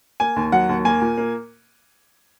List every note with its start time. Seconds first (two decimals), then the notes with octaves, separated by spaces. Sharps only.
0.20 A#3 G#5
0.36 D#2
0.52 F#3 F#5
0.69 D#2
0.85 A#3 G#5
1.02 A#2
1.18 A#3